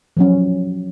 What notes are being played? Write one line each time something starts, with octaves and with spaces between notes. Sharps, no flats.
F3 F#3 C#4